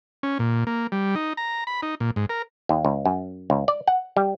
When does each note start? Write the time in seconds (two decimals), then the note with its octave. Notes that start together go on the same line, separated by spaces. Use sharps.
0.23 C#4
0.39 A#2
0.67 A#3
0.92 G3
1.16 D#4
1.37 A#5
1.67 B5
1.82 D#4
2.00 A#2
2.16 G#2
2.29 A#4
2.69 D#2
2.85 C#2
3.05 F#2
3.50 C#2
3.68 D5
3.87 F#5
4.17 G3